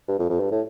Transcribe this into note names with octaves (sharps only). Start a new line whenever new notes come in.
G2
F2
F2
G2
A2